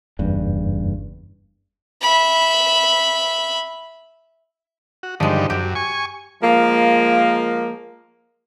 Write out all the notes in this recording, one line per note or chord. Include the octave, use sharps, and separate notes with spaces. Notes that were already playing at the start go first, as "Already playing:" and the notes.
F#1 E2 G2
E5 B5
F#4
G2 D3 D#3 F3 G#3
F#2 G4
G#5 C#6
F3 G#3 A#3